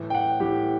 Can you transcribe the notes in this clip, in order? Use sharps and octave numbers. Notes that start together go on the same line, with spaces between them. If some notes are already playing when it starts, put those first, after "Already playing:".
Already playing: A2 E3
G5
F#5
A2 E3 G4